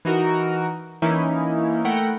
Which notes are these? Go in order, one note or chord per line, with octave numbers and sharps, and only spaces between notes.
E3 D#4 F#4 A#4
E3 A#3 C#4 D#4 E4
A3 E4 A#4 F#5 G5